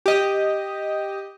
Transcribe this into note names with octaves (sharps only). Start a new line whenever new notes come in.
G4 D#5